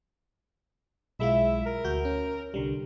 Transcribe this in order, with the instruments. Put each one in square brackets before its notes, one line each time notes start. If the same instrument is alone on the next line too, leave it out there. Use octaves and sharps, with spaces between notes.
[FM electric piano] B1 G#3 F4 [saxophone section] E4 E5
[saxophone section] A#4
[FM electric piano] D2 F#4 G6
C#4
C2 D3 G3